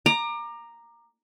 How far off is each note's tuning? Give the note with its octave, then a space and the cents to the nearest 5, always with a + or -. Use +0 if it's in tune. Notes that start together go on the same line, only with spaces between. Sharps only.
A#5 +0 D6 +30